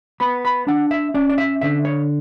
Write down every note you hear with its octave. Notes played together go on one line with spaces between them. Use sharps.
B3 B5
B5
D4 F#5
E5
C#4 D5
D5
E5
D3 E5
C#5